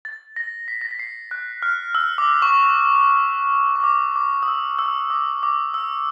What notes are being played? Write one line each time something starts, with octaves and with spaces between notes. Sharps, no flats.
A6
A#6
B6
A#6
B6
C7
F#6
F6
E6
D6
C#6
C#6
D6
D6
D#6
E6
E6
D6
D6
E6